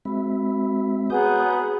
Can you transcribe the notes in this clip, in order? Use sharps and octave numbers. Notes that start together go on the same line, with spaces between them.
G#3 C4 F#4 E5 B5
B3 F#4 G#4 C#5 G#5 A#5 D#6 G6